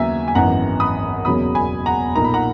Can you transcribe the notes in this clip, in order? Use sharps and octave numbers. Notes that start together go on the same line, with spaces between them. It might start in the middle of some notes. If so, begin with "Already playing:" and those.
Already playing: D#2 C#3 F#3 B3 E5 G#5 A#5
G#5
G#1 F#2 E3 B3 F#5 A#5
B5 D#6
E1 E2 C#3 F#3 A#3 B5 D#6
G#5 B5
F#5 A#5
B1 A#2 A#3 D#4 A#5
B5
F#5 A#5